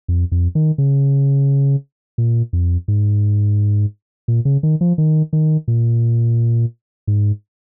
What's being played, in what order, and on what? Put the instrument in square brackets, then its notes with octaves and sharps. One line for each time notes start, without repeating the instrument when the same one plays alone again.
[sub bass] F2
F2
D#3
C#3
A#2
F2
G#2
A#2
C#3
D#3
F3
D#3
D#3
A#2
G#2